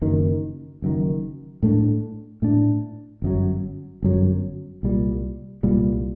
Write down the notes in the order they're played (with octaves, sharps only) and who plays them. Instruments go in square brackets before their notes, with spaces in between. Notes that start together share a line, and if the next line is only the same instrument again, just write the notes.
[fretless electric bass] F#1 F#2 D#3
F#1 F#2 D#3
A2 A3 D4
A2 A3 D4
G1 F#2 F#3
G1 F#2 F#3
C2 A#2 G3
C2 A#2 G3